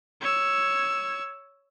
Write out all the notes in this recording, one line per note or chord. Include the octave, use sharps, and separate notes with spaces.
C#5 E6